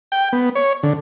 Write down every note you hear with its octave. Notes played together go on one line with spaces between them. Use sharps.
G5
B3
C#5
D3